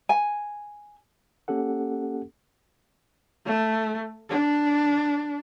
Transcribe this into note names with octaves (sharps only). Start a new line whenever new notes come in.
G#5
A#3 C#4 G4 A4 F#5
A3
D4